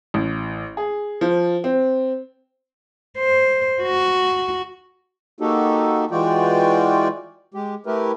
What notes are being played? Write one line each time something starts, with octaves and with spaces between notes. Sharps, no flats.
A1
G#4
F3
C4
C5
F#4
A#3 D#4 F#4 G4 A4
E3 G#3 F4 F#4 D5 G5
G#3 G4
A3 E4 G4 A#4 B4